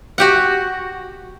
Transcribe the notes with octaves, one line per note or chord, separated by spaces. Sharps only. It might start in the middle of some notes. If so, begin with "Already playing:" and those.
F#4 G4 F#5